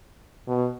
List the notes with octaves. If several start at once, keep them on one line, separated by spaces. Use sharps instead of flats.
B2